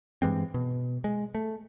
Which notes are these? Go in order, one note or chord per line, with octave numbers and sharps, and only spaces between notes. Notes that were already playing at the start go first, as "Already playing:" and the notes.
G2 E3 G#3 C4
B2
G#3
A3